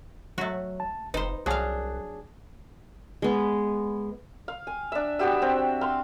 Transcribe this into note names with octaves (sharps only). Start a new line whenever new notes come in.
F#3 A3 F#4
A5
F1 D#4 B4 C5
C2 F#3 D4 G#4 F5 F#6
G#3 B3
F5
G#5
D4 E5
B3 F#4 G4 E5
C4
F5 C6